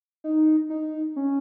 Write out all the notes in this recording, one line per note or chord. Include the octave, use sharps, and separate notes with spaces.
D#4
D#4
C#4